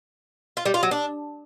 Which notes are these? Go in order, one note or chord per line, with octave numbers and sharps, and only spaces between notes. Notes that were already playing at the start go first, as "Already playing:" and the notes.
F4
G3
F4
F#3
D4